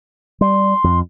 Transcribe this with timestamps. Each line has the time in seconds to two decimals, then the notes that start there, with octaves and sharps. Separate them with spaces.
0.41 G3 C6
0.84 F2